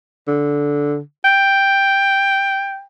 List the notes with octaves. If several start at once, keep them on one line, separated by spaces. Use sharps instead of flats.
D3
G5